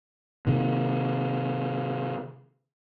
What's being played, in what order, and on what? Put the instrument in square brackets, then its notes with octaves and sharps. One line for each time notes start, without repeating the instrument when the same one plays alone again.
[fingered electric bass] C3 D#3